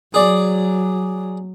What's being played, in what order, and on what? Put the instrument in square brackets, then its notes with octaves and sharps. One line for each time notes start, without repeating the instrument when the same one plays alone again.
[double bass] F#3 [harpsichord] G#4 D5